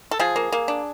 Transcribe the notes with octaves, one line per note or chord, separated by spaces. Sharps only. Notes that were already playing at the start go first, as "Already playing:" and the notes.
A4
F3 G#4
A#3
A#3
D4